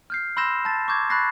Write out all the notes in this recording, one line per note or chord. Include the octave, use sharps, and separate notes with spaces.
F6 G6 C7
B5 C6 E6 G6 A#6 E7
A5 A6
C#6 D6 G6 G#6
B5 C#6 F#6 A6 A#6 C7